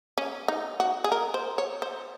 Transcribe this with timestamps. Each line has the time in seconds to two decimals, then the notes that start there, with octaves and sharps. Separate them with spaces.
0.18 C#4
0.48 D#4
0.80 F#4
1.04 G#4
1.12 A#4
1.34 C5
1.58 C#5
1.82 C5